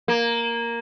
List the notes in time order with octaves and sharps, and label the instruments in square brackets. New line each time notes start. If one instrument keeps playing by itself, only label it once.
[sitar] A#3